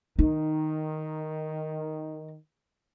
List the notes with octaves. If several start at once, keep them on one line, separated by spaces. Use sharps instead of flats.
D#3 D#4